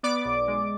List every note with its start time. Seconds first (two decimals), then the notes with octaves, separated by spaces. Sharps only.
0.03 B3 D5 D6
0.25 B1
0.47 G#3